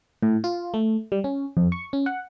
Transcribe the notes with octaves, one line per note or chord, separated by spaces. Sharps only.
A2
F4
A3
G3
C#4
F2
C#6
C#4
F#5